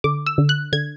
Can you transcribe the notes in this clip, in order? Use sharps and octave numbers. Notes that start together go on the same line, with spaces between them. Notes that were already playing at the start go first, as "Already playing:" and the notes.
D3 D6
E6
D3
F#6
D3 G#6